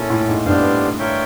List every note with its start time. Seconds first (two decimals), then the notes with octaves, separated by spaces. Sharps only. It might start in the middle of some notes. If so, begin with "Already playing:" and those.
Already playing: A#2 C#4 E4 A4
0.10 A2
0.28 G#2
0.45 G2 B3 D4 G4 C5 F5
0.99 F4 A#4 C#5 E5 G5